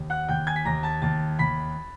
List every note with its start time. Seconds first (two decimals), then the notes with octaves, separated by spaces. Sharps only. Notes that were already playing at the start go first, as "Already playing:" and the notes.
Already playing: D#2
0.10 F#5 F#6
0.29 D#2 G5 G6
0.47 G#5 G#6
0.56 B6
0.65 D#2 A#5 A#6
0.83 A5 A6
1.02 D#2 A5 A6
1.39 D#2 B5 B6